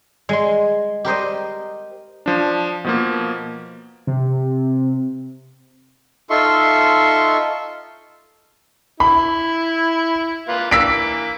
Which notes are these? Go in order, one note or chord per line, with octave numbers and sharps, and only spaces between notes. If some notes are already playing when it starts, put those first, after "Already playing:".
G#3 C6
G4 A#4 C5 D#5
F3 D4
B2 F3 A#3
C3
D#4 F4 A4 E5 C6 C#6
E4 B5
A#3 F4 B4
E3 A#3 E6 B6 D7